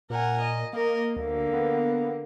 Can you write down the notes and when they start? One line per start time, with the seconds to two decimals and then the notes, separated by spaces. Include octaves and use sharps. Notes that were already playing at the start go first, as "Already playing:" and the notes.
0.10 A#2 A#4 F#5 G#5
0.40 D#5
0.73 A#3 A#4 D#5
1.17 D2 D3 A#3
1.53 B3